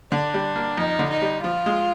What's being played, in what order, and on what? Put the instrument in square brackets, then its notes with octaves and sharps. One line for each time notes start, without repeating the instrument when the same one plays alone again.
[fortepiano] D3 [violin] D4
[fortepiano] G3
A#3
[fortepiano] F2 [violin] D#4
[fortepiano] D3
[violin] D#4
[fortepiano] G3
[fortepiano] F3 [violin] F4
[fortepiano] G#3